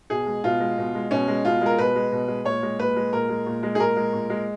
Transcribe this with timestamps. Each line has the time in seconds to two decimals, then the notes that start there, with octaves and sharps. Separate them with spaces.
0.10 B2 G#4
0.26 G#3
0.44 B2 F4
0.60 G#3
0.78 B2
0.95 G#3
1.11 B2 C#4
1.28 G#3
1.45 B2 F4
1.61 G#3 A#4
1.78 B2 B4
1.95 G#3
2.12 B2
2.28 G#3
2.45 A#2 C#5
2.63 G#3
2.79 A#2 B4
2.96 G#3
3.13 A#2 A#4
3.29 G#3
3.46 A#2
3.63 G#3
3.75 G#4
3.80 A#2 A#4
3.96 G#3
4.13 A#2
4.30 G#3